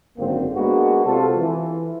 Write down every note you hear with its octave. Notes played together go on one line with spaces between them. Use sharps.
G#1 F#2 D3 A#3 C4
G#3 A#3 B3 D4 F#4
C3 F4 A4
E3